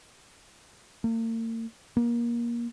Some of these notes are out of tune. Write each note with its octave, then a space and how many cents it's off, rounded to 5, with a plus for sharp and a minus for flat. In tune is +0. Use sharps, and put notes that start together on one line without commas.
A#3 -45
A#3 +25